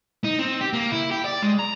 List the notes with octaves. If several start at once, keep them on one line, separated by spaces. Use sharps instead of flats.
D#4
C4
G4
A#3
E4
G4
D5
G#3
A#5